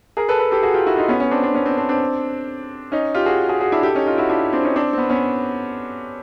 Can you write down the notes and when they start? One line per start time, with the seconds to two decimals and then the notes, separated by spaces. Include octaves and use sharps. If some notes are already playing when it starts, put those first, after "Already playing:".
0.17 G#4 A#4
0.28 A4 B4
0.39 A4 B4
0.51 G4 A4
0.62 F#4 G#4
0.74 F4 G4
0.86 E4 F#4
0.97 D#4 F4
1.09 B3 C#4
1.20 B3 C#4
1.31 C4 D4
1.43 C4 D4
1.54 B3 C#4
1.65 C4 D4
1.77 C4 D4
1.89 C4 D4
2.92 C#4 D#4
3.14 F4 G4
3.26 F#4 G#4
3.49 F#4 G#4
3.61 F#4 G#4
3.72 D4 E4
3.83 G4 A4
3.95 C#4 D#4
4.06 D#4 F4
4.18 E4 F#4
4.29 D4 E4
4.53 C4 D4
4.63 C#4 D#4
4.76 C4 D4
4.93 C4
4.98 B3
5.09 B3 C#4